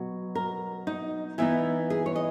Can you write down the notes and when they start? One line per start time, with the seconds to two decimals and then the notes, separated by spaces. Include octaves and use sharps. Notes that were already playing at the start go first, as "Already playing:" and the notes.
Already playing: B2 F#3
0.35 A#4
0.87 D#4
1.38 E3 B3 D#4 E4
1.90 G#4
2.06 C#5
2.16 D#5